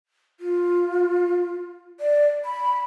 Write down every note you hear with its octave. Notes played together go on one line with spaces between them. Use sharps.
F4
D5
B5